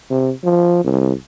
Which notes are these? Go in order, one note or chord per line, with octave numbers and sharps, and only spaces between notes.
C3
F3
C2